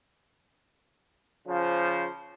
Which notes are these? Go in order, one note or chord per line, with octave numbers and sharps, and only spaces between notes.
C#3 F3